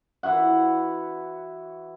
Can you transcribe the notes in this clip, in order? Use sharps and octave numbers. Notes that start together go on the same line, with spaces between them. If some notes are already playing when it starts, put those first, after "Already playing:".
E3 E4 F#4 F#5